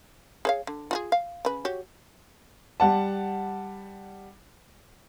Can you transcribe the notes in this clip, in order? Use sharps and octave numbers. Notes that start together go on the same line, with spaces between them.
G#4 C#5 F5
D3
F4 F#4 G#4
F5
C#3 B4
F#4 G4 C#5
G3 F#5 A5